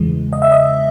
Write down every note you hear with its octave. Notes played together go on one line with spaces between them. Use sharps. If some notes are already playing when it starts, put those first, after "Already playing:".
Already playing: E2 C#3 E3 G#3
D#5
E5
D#5